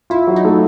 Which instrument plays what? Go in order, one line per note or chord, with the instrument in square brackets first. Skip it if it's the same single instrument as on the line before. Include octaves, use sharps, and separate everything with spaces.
[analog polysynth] E4 [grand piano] F4
[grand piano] F#3
[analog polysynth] D#4
[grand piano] A3